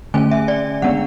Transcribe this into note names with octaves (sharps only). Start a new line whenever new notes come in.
D3 A3 C#4 G#5
E5
D5
D3 G#3 B3 D4 F#5